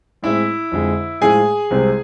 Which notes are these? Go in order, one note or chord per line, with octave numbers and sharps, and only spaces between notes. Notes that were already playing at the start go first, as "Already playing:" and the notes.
A2 G#3 C4 E4 E5
F2 D3 G#3
A2 F3 G#3 G#4 G#5
C2 C3 G#3 C4